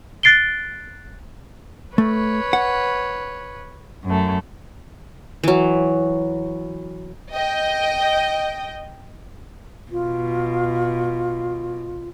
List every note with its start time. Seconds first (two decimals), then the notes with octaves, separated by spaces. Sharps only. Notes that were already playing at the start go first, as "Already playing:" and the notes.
0.23 F#6 A6 C7 D7 G7
1.98 A3 B4 C#5
2.53 F#5
4.05 F#2 A3
5.44 E3 F#3
7.32 D#5 G5
9.91 B2 F4